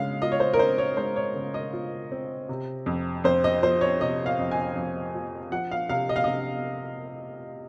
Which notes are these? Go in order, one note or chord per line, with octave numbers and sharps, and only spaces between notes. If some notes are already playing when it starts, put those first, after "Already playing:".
Already playing: C#3 G#3 F5
F4 D#5
C#5
C5
A#4
C4 C5
C#5
G#3 C5
C#5
C#3
D#5
F4
C4
C3
F2
F2 C5
D#5
F3 C5
C#5
C3 D#5
F5
F2
G#5
F2
F3
F3 F#5
F5
C3 F5
D#5
F5
C3 D#5